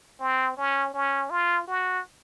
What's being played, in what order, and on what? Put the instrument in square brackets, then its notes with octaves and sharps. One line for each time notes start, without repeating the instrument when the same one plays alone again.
[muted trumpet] C4
C#4
C#4
F4
F#4